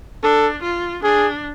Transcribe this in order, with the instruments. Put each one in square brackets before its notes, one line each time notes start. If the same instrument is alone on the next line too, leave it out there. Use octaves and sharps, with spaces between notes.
[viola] D4 [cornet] A4
[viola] F4
[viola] D4 [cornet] G#4